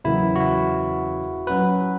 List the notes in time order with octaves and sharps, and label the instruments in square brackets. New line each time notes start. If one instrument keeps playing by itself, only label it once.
[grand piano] E2 C#3 F#3 A#3 [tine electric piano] E4
[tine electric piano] F#4
E4
[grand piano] F#3 C#4 F#4 [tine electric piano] B4